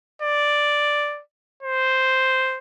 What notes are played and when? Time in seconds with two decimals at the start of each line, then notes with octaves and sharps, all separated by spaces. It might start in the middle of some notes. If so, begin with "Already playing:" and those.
0.22 D5
1.63 C5